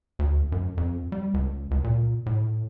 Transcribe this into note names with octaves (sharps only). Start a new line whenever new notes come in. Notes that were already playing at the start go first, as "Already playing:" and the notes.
D2
F#2
F2
G3
C#2
C#2
A#2
A2